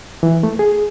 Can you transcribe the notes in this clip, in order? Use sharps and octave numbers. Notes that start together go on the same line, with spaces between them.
E3
A3
G#4